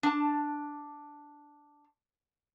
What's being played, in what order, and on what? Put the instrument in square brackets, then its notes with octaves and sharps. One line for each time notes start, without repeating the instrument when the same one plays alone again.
[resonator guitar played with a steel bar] D4 A5